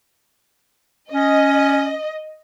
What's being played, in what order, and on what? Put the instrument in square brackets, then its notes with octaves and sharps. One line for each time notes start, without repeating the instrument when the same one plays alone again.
[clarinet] C#4 [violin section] D#5